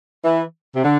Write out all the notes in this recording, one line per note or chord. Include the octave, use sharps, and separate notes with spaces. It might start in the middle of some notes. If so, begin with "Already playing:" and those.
E3
C3
D3